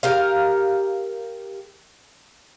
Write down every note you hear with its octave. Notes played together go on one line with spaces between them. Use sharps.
G4 A#4 F5